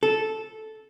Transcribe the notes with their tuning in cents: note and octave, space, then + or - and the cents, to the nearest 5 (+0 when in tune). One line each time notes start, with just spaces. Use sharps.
A4 -10